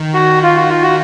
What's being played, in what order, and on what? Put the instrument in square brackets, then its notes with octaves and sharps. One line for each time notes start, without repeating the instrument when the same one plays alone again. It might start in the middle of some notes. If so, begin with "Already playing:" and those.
Already playing: [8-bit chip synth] D#3
[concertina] F#4
F4
F#4
F4
F#4